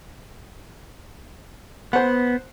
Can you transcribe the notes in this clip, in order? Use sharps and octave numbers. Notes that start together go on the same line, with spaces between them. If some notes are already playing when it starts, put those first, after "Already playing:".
B3 C5 F#5